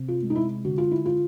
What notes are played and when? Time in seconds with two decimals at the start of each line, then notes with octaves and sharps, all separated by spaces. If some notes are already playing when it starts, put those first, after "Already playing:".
Already playing: C3
0.08 F4
0.22 G#3
0.30 D#4
0.35 E4
0.65 D3 F#4
0.78 F4
0.91 E4
1.06 F4